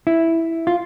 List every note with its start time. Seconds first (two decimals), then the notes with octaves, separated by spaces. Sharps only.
0.07 E4
0.67 F4